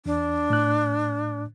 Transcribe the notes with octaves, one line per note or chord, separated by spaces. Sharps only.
E2 D4
A2 F#6